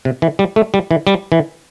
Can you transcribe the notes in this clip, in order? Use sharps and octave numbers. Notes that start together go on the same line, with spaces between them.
C3
E3
G3
A3
G3
E3
G3
E3